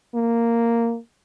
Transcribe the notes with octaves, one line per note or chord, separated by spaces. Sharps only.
A#3